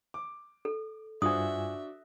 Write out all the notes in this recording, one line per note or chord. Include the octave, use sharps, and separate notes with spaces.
D6
A4
G2 D4 F4 F#4 C5 E5 G#5 D#6